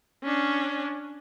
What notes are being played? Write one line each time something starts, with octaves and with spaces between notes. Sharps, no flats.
C#4 D4